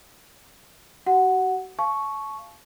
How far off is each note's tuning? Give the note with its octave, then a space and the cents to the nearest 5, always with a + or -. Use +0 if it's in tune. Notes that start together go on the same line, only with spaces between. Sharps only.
F#4 +40 F#5 +0
F5 -20 A5 -30 C#6 +0